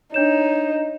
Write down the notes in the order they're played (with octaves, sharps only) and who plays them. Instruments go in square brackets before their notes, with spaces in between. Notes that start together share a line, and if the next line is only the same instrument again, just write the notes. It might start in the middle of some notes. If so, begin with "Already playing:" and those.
[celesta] D4 G6 E7 [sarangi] D#4 [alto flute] C#5